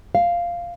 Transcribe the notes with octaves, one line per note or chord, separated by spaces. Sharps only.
F5